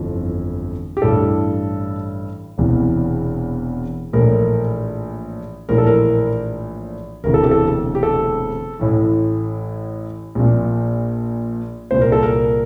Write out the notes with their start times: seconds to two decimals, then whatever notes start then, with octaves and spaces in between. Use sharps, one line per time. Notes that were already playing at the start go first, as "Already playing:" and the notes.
Already playing: G1 F2 E3
0.97 G4
1.02 A1 G2 E3 A4
2.58 E1 E2 C3 E3
4.13 A#1 A2 E3 A#4
5.69 A#1 A2 E3 A#4
5.78 A4
5.87 A#4
7.24 E1 D2 C3 E3 A#4
7.34 A4
7.43 G4
7.51 A4
7.95 G4
8.03 A4
8.79 A1 A2 E3
10.35 A#1 A#2
11.91 C2 A#2 C5
12.01 A#4
12.12 A4
12.23 A#4